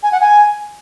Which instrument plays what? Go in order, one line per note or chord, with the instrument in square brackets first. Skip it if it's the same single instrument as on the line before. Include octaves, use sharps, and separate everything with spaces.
[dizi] G#5
F#5
G#5